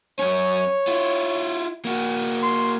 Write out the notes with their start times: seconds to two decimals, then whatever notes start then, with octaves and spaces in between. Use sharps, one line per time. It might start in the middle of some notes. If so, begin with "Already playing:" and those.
0.19 F#2 C#4 C#5
0.88 E4 F4
1.85 A#3 F#4
2.43 C6